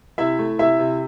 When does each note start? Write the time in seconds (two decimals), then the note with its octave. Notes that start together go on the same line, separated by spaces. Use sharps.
0.18 C3 E4 E5
0.39 A3
0.58 C3 E4 E5
0.79 C3